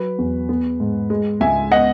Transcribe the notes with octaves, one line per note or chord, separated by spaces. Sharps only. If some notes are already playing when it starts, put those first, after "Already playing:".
Already playing: F#3 B4
E2
B3
G#2
G#3
C#2 E5 G#5
B3 D#5 F#5